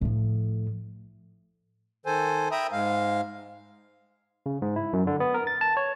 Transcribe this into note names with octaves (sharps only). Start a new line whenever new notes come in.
A2 F3
D#3 A4 C5 G#5
E5 G5 A#5 B5 D#6
G#2 G#3 F5
C#3
G#2
E4
F#2
D3
B3
A#4
A6
A5
C#5